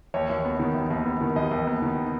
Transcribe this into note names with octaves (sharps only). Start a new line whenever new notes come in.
D#2 C#5
D#2
B3
D#3
D#2
D#2
B3
D#3
D#2 D#5
D#2
B3
D#3